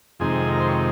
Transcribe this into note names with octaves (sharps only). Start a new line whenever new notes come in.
F2 C3 D#3 G#3 G#4
A#4
C5
C#5